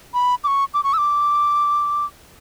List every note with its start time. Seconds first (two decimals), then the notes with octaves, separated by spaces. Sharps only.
0.14 B5
0.44 D6
0.47 C#6
0.74 D6
0.84 C#6
0.93 E6
0.98 D6